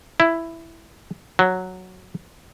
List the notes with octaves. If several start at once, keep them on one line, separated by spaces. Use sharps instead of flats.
E4
F#3